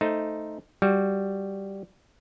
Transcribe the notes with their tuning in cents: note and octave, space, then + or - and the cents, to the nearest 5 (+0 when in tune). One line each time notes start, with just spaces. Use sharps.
A3 +0 D#4 +0 C5 +0
G3 +0 F#4 +0